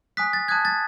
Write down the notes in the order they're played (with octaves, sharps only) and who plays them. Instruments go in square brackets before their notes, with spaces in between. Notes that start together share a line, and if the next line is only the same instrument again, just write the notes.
[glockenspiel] G#5 D#6 F#6 B6
A6
A5 D#6 F#6 G#6
A6